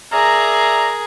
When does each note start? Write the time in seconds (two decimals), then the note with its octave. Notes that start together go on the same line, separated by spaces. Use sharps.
0.13 G#4 A#4 D5 E5 A#5